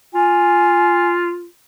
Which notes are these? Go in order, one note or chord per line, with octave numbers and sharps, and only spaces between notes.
F4 G#5